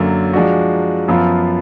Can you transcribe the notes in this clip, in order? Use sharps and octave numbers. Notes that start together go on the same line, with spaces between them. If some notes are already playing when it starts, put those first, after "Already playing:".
Already playing: F#2 D3 F#3 A#3
F3 G#3 D4 F#4
F#2 F3 B3 F4